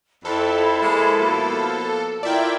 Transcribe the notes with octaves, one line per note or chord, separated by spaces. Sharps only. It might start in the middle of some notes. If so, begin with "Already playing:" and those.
F2 E4 A4 B5
G#3 A#3 C5
B2 F3 A#3
E4 F4 A#4 D5 E5 G5